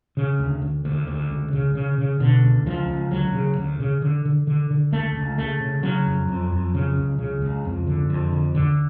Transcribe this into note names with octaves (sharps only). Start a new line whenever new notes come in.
C#3
D2
D2
D2
D2
C#2
C#3
C#3
C#3
B2 D3
C#2
C#2 F3
C#2
D2 F#3
C#3
D2
C#3
D3
D3
D3
D3
C#2 A3
C#2
C#3 A3
C#3
C#3 F#3
F2
F2
F2
C#3
C#2
C#3
C#2
F2
D3
F2
D3
D2 D3